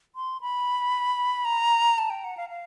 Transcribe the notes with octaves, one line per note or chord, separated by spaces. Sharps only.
C6
B5
A#5
A5
G5
F#5
F5
F5